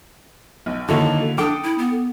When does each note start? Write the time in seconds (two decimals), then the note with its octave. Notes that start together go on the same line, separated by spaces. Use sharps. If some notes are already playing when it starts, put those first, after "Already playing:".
0.66 B1
0.89 D3 D#3 A#3 E4 F#4 A4 C#5
1.38 D4 A4 G5 D6 D#6
1.63 E4
1.78 B3